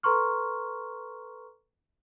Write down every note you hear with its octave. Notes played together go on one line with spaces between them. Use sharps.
A4 B4 A#5 C6 C#6 F6